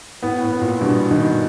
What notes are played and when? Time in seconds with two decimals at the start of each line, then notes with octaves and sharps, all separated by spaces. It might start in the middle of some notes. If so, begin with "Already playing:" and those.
0.23 A2 B3
0.42 A2
0.52 B3
0.61 A#2
0.81 G2 B2
1.11 B2 D#3